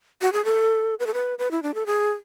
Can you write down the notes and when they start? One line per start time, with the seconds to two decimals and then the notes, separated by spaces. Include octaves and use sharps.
0.22 F#4
0.33 G#4
0.45 A4
1.00 B4
1.07 A4
1.14 B4
1.39 B4
1.51 E4
1.63 D4
1.74 A4
1.86 G#4